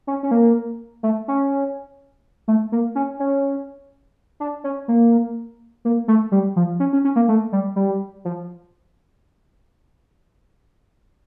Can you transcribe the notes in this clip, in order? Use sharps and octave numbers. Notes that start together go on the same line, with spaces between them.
C#4
C#4
A#3
A3
C#4
A3
A#3
C#4
C#4
D4
C#4
A#3
A#3
A3
G3
F3
C#4
C#4
C#4
A#3
A3
G3
G3
F3